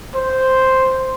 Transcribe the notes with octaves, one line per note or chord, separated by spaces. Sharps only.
C5